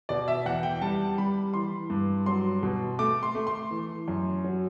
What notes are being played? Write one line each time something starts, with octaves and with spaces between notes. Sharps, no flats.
B2 D5
E5
E2 F#5
G5
G3 A5
G3 B5
E3 C6
G2
F#3 C6
B2
A3 D6
C6
A3
C6
E3
F#2
F#3